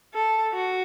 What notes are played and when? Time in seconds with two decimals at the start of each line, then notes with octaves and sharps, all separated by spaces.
0.14 A4
0.53 F#4